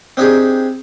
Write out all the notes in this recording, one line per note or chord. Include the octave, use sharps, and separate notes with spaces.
C4 D4 D#4 G4 G#4